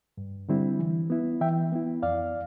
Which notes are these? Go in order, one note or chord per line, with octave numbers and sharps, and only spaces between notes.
G2
D3 G3 C4 E4
E3
B3 E4
E3 E5 G5
B3 E4
F2 D5 F5